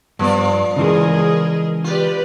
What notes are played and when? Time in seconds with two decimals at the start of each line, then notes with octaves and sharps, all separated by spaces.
0.19 G2 F3 B3 D5
0.76 C#3 E3 G#3 G#4 A#4 D#5
1.84 F4 G4 B4 D5